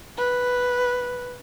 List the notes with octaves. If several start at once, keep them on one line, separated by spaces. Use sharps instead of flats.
B4